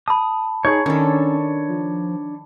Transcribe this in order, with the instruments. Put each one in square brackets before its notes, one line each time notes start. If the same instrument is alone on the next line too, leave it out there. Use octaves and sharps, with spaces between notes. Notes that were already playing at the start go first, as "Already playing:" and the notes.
[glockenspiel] A5 B5 [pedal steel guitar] D#6
[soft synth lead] D#4 [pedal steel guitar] G#4 C#5
[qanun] D#3 A4 [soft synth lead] C#4 [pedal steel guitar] D4 C#5
[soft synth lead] F3